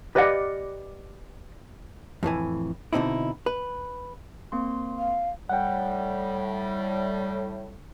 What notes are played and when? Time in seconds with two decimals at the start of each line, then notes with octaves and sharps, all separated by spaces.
0.15 G4 B4 D5 D#5 F5 F#5
2.23 F2 A2 E3 G#5
2.93 B2 D3 C4 D#4 E4
3.46 B4
4.52 A#3 C4 C6
4.98 F5
5.49 A2 G3 F#5 G5